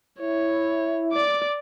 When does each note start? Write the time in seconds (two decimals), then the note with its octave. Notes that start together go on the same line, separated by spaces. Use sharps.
0.20 E4 C#5
1.12 D5 D6